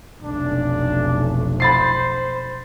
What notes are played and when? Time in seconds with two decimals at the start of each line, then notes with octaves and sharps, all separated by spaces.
0.23 F1 B1 D4
1.60 C5 B5 A6 C7